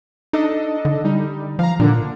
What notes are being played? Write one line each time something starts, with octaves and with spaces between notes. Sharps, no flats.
D4 D#4 A4 D#5
D3
G3 D#4
F3 F5 A#5
A#2 D3 A#3 D4